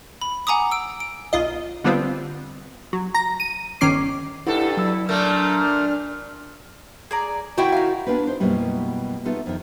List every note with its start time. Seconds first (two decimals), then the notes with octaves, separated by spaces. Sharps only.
0.21 B5
0.47 F#5 G#5 A#5 D6 D#6
0.71 E6 D7
1.00 D7
1.33 B1 F4 D#5
1.84 D3 G3 B3 C4 F4
2.93 F#3
3.14 A#5 A#6
3.40 D#7
3.81 G1 D#3 C#4 D6 C7
4.47 G2 D#4 E4 A4 F#5
4.77 F#3 E4 E6
5.09 A#2 A3 A#3 D4 F6 G6
5.58 F6
7.11 G#4 D5 A#5
7.58 D#3 E4 F#4 G4 D5 G5
7.72 D#4 F5
8.07 B3 D4 F4 G4 B4
8.27 D#4 C5
8.40 F#2 B2 G3 A#3 B3 E4
9.25 A3 B3 D#4 F4 A4
9.46 F2 D#3